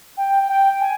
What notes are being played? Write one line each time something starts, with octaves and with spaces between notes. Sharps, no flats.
G5
G5
G#5